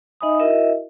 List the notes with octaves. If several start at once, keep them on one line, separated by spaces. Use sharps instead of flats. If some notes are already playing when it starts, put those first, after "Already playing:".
D#4 D#5 E5 G#5 B5 D#6
E4 F#4 A#4 D#5 E5